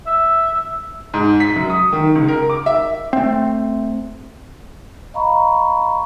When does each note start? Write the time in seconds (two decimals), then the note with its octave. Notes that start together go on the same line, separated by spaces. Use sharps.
0.07 E5
1.14 G#2
1.40 B6
1.56 F#2
1.70 D#6
1.93 D#3
2.15 C#2
2.28 A#4
2.50 D6
2.66 E5
3.13 A3 C4
5.14 D#5 F5 A#5 B5 C#6